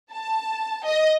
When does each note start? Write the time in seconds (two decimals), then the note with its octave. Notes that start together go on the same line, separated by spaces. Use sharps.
0.11 A5
0.85 D#5